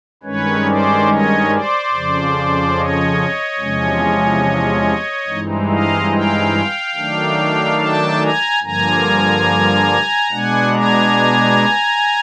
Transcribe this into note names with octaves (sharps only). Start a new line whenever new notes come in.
G2 D#3 G#3 C#4 B4 C#5
C5 D5
C#5 D#5
C5 D5
F2 C#3 F3
C#5 D#5
E2 C3 F3 G#3 C#4
G2 E3 G#3 C4 D#4
D#5 F5
F5 G5
D#3 F#3 A3 D4
G5 A5
G#5 A#5
G2 D3 F3 A#3 G#5 A#5
B2 G#3 B3 D4 F#5 G#5
G#5 A#5